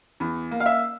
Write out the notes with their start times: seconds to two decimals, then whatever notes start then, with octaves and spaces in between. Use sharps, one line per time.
0.20 E2
0.51 A#3
0.60 F5
0.66 E5